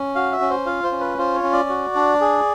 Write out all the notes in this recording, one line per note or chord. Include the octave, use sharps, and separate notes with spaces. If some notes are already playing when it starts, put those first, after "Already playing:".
Already playing: C#4
F#4 F5
E5
C#4
C5
F4 F5
C5
C#4
B4
F4 C5
C#5
C#4
D5
F#4
D4
G#4